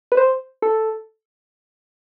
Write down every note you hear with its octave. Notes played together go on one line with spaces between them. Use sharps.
B4
C5
A4